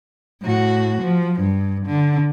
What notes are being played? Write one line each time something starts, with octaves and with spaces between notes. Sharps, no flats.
A2 F#4
F3
G2
D3